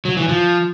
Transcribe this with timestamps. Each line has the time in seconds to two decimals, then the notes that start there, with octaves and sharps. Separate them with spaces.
0.05 F#3
0.17 E3
0.29 F3